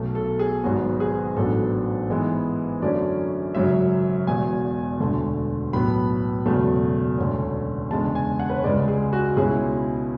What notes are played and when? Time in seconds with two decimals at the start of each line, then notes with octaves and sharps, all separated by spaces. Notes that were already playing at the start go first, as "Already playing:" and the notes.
Already playing: B1 B2 A3
0.15 A4
0.39 G#4
0.63 G#1 G#2 F#3 B3 F#4
1.00 G#4
1.37 A1 G#2 F#3 B3 D4 A4
2.10 G#2 E3 G#3 B3 E4
2.82 F#2 D3 F#3 A3 C#4 D5
3.55 G#1 F#2 C#3 F#3 C#4 E5
4.27 E1 E2 B2 G#5
5.00 E1 D2 D3 A3
5.73 B1 A2 F#3 B3 B5
6.46 E1 E2 C#3 F#3 A3
7.18 E1 D2 D3 A3 C#4
7.91 E2 C#3 G#3 D4 A5
8.15 G#5
8.39 F#5
8.50 B4
8.57 C#5
8.64 C#2 C#3 G#3 D5
8.88 G#4
9.13 F#4
9.37 C#2 B2 G#3 C#4 E4 G#4